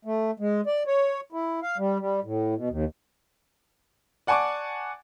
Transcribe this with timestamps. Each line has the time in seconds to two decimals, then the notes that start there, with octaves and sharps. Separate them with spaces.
0.05 A3
0.40 G#3
0.67 D5
0.87 C#5
1.32 E4
1.63 F5
1.78 G3
1.99 G3
2.24 A2
2.55 B2
2.70 D#2
4.27 D5 F#5 G#5 A5 C#6 D6